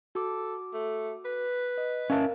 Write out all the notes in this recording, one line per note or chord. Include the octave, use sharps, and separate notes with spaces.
F#4 A4 D6
A3
B4
D#5
C#4 A#4 E5 F5 A5